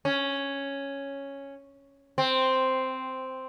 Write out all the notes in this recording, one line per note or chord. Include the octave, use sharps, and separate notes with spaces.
C#4
C4